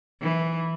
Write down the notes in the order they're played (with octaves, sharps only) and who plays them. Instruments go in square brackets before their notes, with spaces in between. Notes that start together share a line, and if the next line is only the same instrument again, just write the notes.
[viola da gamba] E3